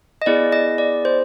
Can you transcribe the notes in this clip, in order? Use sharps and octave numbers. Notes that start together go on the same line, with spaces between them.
D#5
B3 E4 G#4 D5
D#5
D5
C5